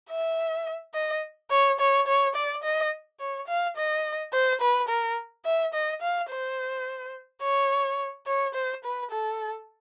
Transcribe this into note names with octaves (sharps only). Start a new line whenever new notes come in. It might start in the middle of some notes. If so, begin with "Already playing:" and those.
E5
D#5
C#5
C#5
C#5
D5
D#5
C#5
F5
D#5
C5
B4
A#4
E5
D#5
F5
C5
C#5
C#5
C5
B4
A4